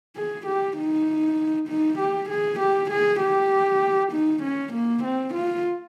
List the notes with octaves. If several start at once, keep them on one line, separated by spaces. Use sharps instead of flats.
G#4
G4
D#4
D#4
G4
G#4
G4
G#4
G4
D#4
C#4
A#3
C4
F4